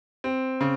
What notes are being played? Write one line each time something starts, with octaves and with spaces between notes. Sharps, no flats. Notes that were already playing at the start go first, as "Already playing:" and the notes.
C4
C#3